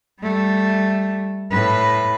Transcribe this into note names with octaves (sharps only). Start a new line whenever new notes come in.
G3 A3
A2 B4